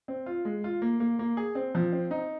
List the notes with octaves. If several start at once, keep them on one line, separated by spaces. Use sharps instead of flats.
C4
F4
G#3
F4
A#3
A#3
A#3
G#4
C4
F3
C4
D#4